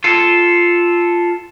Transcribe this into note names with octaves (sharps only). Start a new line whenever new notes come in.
F4 A4